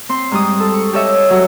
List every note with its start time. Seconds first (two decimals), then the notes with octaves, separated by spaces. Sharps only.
0.09 C4 C6
0.31 G#2 G3 D#6
0.60 A4
0.74 C#6
0.93 G4 A4 C#5 D#5 E5
1.30 F#3